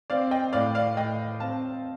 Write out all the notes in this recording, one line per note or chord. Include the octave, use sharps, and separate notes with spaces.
C4 D5 F5
D#5 G5
A2 D5 F5
D5 F5
A2 D#5 G5
C4 F5 A5